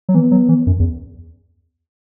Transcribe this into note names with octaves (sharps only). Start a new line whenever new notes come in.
F#3
E3 B3
F#3
E3
F#2
E2